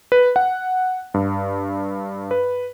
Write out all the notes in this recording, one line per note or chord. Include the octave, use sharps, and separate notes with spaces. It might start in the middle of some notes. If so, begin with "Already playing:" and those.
B4
F#5
G2
B4